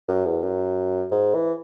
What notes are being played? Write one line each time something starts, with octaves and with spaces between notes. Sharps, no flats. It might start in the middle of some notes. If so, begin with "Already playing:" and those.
F#2
E2
F#2
G#2
E3